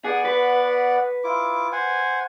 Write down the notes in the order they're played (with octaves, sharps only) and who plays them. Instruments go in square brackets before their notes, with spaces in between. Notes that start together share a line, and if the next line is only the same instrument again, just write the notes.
[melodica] B3 D5 F#5 [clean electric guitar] G#4
[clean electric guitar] B4
[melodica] E4 F4 D6
C5 F#5 G#5